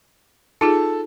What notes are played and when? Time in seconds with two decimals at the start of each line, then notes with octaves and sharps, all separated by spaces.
0.61 D#4 F4 G#4 A4 A5